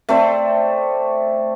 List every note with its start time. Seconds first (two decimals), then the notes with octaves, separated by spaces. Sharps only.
0.09 A3 C4 C5 D5